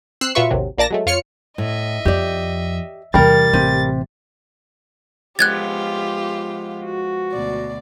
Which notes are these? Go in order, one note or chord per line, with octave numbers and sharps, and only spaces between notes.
C4 E6 F#6 C7
A#2 F#3 F4 B4 E5 C#6
A1 D#2 C3 F#3
A#1 A#3 D5 A5 A#6
F#3 G#3 A3
F2 F4 C#5 F6 C#7
A2 D#5 E5
F2 G4 D5
E2 C3 G3 A#4 A6
A1 C3
F3 G#3 B3 F4 G4 F#6 G#6 A6
F#4
D2 B2 D5